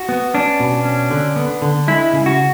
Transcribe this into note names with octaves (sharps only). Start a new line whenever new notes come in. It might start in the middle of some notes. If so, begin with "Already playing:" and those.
Already playing: F#4
B3
C#4 D4
B2
C#4
D3
B3
D3
G#3 E4
C#3
F#4